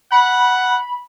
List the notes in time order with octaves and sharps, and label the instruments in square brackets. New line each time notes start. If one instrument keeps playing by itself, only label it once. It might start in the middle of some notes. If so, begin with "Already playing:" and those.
[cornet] F#5 [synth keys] B5